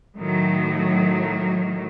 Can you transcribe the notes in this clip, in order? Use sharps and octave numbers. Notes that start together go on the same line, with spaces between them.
A2 D#3 F#3